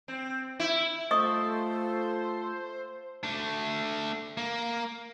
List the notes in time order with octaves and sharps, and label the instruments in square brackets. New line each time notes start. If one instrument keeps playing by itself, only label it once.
[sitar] C4
E4
[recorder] A3 [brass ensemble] F4 A4 [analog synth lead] C5 [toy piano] D#5 C#6 D#6
[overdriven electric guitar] A3 D4
A#3